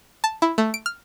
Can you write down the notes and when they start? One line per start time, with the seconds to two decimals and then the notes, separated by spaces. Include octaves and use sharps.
0.24 A5
0.42 E4
0.58 A3
0.74 D7
0.86 F6